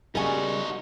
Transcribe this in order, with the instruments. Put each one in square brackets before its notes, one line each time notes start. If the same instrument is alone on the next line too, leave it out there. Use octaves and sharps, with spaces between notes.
[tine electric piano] C#3 C#6 [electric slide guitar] G3 [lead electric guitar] D#4 F#4 [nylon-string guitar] A#4 G#5